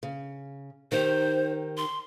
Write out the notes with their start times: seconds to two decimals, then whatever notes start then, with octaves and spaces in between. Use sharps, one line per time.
0.03 C#3
0.92 D#3 D#4 G4 C5
1.77 C6